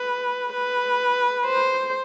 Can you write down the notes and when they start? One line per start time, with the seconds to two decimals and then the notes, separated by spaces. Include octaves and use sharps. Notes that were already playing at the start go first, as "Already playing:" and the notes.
Already playing: B4
0.53 B4
1.45 C5